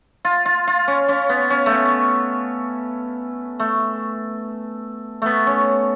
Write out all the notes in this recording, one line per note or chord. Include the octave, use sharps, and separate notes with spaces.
F4
F4
F4
C#4
C#4
B3
C#4
A3
B3
A3
A3 B3
C#4